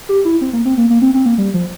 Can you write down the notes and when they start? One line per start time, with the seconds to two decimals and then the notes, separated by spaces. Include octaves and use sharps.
0.09 G4
0.25 E4
0.41 C4
0.53 A#3
0.65 C4
0.77 A#3
0.90 A#3
1.02 C4
1.14 C4
1.26 A#3
1.38 G3
1.54 F3